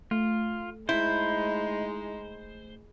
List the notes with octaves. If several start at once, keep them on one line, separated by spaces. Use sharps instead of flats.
A3 F4
G#3 D#4 E4 C5